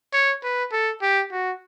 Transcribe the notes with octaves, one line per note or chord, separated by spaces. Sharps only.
C#5
B4
A4
G4
F#4